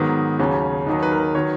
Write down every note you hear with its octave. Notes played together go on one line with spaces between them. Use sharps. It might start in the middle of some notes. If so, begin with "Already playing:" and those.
Already playing: G#2 D#3 F#3 B3
D#2 C#3 F#3 C#4
D#2 D#3 F#3 D#4
B4
A#4
B4
D#3 F#3 C#5